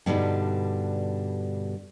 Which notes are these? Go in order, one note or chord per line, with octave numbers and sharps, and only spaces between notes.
G2 B2 D3 G3 D#4